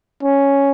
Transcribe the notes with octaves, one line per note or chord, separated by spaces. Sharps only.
C#4